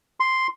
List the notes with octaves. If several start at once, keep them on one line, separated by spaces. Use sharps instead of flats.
C6